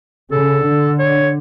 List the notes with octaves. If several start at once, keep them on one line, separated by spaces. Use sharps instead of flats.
C#3 A4
D3
C#5